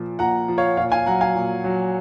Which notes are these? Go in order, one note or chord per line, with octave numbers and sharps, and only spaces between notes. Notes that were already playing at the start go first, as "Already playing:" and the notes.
Already playing: A#2 F3
A#2 F#5 A#5
F3
C#5 F5
A#2 C#5 F5
F5 G#5
F#3 F#5 A#5
F5 G#5
A#2
F#3